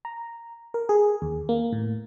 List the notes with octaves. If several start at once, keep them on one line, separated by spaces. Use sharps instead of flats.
A#5
A#4
G#4
D#2
A#3
A2